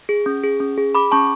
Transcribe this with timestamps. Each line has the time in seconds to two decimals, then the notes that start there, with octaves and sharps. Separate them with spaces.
0.09 G#4
0.26 C#4
0.44 G#4
0.60 C#4
0.78 G#4
0.95 G#4 B5 D6
1.12 C#4 A5 C#6